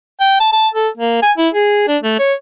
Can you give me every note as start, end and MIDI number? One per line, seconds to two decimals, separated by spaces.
0.21 0.39 79
0.40 0.52 81
0.53 0.68 81
0.74 0.89 69
0.97 1.19 58
1.22 1.32 80
1.38 1.49 64
1.54 1.83 68
1.88 1.98 62
2.03 2.19 57
2.19 2.33 73